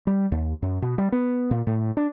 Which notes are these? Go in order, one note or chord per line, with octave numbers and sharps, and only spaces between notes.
G3
D#2
F#2
B2
G3
B3
A#2
A2
D4